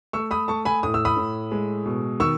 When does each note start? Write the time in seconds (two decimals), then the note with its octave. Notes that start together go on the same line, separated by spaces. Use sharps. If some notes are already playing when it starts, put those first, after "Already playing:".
0.13 A3 C#6 E6
0.31 B5 D#6
0.48 A3 A5 C#6
0.65 G#5 B5
0.83 A2 D#6
0.94 E6
1.05 B5 D#6
1.16 A2
1.52 G#3
1.86 B2
2.20 D#3 C#6 E6